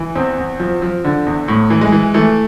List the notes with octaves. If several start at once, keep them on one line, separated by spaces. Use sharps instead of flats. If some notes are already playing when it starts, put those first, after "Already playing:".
Already playing: E3
E2 C4
E2
F3
F3
D3
E2
A2
E3
G#3
E3
E3 A3